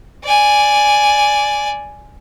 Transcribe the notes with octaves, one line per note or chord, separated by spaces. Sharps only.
D5 G#5